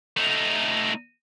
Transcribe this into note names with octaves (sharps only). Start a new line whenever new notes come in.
A3 D#4